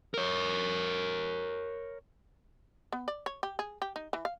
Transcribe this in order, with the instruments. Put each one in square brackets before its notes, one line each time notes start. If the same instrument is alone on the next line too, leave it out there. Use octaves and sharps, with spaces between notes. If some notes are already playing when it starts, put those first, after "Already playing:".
[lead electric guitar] A#4 C#5
[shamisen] B3
D5
C#5
G4
G#4
G4
D#4
E3
F5